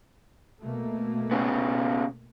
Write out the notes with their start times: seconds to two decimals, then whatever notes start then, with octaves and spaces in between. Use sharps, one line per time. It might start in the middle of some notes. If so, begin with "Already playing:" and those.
0.63 B2 A3 A#3
1.31 C#3 B3